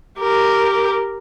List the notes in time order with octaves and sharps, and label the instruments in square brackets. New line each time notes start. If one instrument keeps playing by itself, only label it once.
[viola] G4 A#4